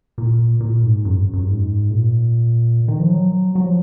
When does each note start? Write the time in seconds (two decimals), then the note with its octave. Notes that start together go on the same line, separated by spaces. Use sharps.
0.18 A#2
0.60 A#2
0.83 G#2
1.05 F#2
1.33 F#2
1.47 G#2
1.90 A#2
2.88 D#3
3.00 F3
3.10 F#3
3.55 F#3
3.64 F3